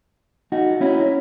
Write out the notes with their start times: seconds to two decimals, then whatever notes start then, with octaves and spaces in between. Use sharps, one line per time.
0.52 D#4 F#4
0.81 C#4 E4